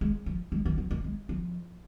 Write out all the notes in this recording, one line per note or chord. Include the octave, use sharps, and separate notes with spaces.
G#3
F3
G#3
D#3
F3
A#3
G#3
F3